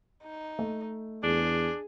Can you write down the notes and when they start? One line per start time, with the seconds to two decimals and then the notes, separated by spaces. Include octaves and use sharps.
0.23 D#4
0.59 A3
1.23 E2 D4 G#4